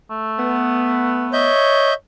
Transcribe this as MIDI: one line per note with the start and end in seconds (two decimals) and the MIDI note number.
0.10 1.50 57
0.39 1.50 59
1.33 1.94 73
1.33 1.94 75
1.33 1.94 76
1.33 1.94 91